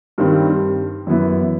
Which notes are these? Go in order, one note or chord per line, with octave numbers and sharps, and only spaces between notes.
G2 D#3 G3 C4
F#2 E3 B3 E4